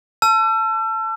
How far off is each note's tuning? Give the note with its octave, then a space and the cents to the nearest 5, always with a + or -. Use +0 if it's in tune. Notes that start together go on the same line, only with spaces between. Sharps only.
A5 +0 E6 +40